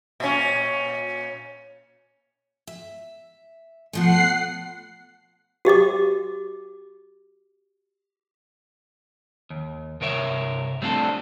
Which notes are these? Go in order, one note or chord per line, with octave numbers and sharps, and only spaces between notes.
A#2 C#4
E5
B2 F3 A3 F#5 C7
F#4 G4 D#5 D6
D#2
C2 G2 A#4 C#5 E5
G3 A3 C4 D4 F4 A4